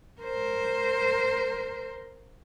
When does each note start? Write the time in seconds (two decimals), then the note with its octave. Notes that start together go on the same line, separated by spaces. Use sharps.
0.21 A#4 C5